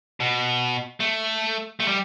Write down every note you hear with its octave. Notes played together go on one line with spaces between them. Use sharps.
B2
A3
A3
G3